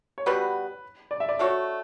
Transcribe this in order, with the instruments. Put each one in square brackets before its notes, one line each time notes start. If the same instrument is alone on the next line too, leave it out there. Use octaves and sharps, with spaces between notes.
[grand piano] C#5
[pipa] B2 G3 B3 F#4 [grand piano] B4
[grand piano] D5
E5
D5
[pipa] A3 D4 F#4 C#5